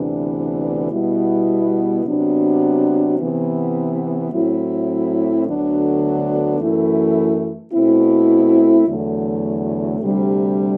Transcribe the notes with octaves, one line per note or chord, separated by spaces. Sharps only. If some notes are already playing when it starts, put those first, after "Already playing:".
Already playing: D2 C3 E3 B3 D4
B2 G3 B3 E4
C3 F#3 B3 D4
C3 E3 B3
A2 F#3 C4 E4
D2 D3 F#3 B3 D4
F#2 E3 A3 E4
B2 A3 C4 E4
E2 D3 F#3 A3
D2 C3 G3 D4